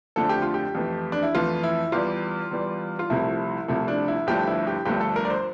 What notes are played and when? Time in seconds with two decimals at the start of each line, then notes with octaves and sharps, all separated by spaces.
0.16 F2 D3 F3 A3 A4
0.29 G4
0.42 F4
0.54 G4
0.75 F2 E3 A3
1.12 D4
1.23 E4
1.35 F2 E3 A3 F4
1.63 E4
1.92 E2 E3 G3 F4
2.51 E2 E3 G3
2.99 F4
3.10 C2 C3 F3 A3 E4
3.68 C2 C3 F3 A3 E4
3.88 D4
4.08 E4
4.27 G1 G2 F3 A3 G4
4.47 E4
4.67 G4
4.85 G1 G2 F3 A3 G4
5.01 A4
5.16 A#4
5.25 D5
5.30 C5